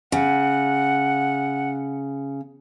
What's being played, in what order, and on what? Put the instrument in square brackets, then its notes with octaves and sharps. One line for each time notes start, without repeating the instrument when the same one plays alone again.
[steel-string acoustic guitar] C#3 [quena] F#5